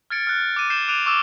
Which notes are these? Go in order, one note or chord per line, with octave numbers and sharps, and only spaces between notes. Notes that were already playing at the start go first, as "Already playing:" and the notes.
F6 G#6 A6 C#7 D7
F6 F#6
D6 D#7
G6 C7 E7 G7
D6 F#6 D7 D#7 F7
C#6 D6 E6 E7